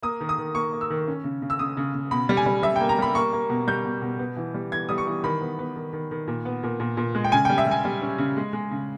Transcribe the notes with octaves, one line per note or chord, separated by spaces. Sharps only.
A#3 D#6
D#3
D#6
D#3
A#3 C#6
A#3
E6
D#3
C#4
C#3
C#3
E6
C#3 D#6
C#3
C#3
B2 B5
G3
G#5
G3
G3 E5
A#3 G5
A#5
G3 B5
A#3 C#6
A#3
B2
G3 G6
B2
B2
B3
E3
G3
E3 G#6
G3 D#6
C#6
E3
D#3 B5
B3
B3
D#3
D#3
D#3
A#2
B3
A#2
A#2
A#2
G#3
G5
C#3 G#5
G3 G5
E5
G3 G#5
G3
C#4
C#3
G#3
G#3
C#3